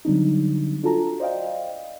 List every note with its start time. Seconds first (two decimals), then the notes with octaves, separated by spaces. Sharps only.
0.05 D3 F#3 G3 C4 D4 D#4
0.83 D4 F4 F#4 A4 A5 A#5
1.20 C5 D5 D#5 F5 G5